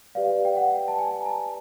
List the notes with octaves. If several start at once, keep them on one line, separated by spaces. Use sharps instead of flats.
G4 B4 D5 F5
G5
F#5
A5
G#5
A#5
A5